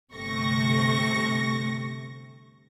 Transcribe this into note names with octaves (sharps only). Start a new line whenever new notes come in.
G1 C3 A3 C#6 A#6